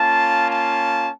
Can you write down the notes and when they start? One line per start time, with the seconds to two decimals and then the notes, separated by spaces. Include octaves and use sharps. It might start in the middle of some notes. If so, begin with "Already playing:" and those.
Already playing: A#3 C#4 F4 A5
0.49 A5